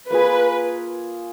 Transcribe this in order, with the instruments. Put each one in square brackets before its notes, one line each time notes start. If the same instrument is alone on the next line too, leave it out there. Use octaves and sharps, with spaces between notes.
[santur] A#3 F4 G#4 [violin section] B4